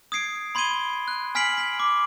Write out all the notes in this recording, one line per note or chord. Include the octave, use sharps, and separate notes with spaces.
D#6 G#6 C7 D7
B5 C6 G#6 C7 D#7 G7
F#6
G#5 F6 B6 C7 D7 F#7
B6
D6